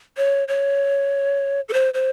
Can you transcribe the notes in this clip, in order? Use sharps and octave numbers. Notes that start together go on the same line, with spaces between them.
C#5
C#5
A4
C5
C5